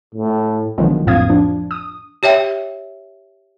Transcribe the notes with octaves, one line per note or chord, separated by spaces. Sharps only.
A2
B1 D3 D#3 F3 F#3 G#3
A#1 F2 A2 F5 D#6 G#6
F3 D4
D#6
G4 C#5 E5 G5